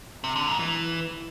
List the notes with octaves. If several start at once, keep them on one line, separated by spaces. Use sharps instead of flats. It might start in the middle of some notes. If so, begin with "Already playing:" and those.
C3
D3
G#2
E3